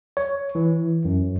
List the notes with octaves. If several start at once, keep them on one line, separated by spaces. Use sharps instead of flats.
C#5
E3
F#2